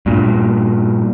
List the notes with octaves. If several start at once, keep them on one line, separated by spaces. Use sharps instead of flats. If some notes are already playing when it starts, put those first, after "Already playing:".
G2 A#2